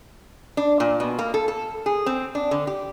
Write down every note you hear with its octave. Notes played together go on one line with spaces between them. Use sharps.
D4
A#2
B2
A#3
A4
A4
G#4
C4
D4
D3
G4